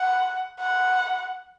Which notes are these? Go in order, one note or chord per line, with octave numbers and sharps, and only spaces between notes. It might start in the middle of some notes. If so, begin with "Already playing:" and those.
Already playing: F#5
F#5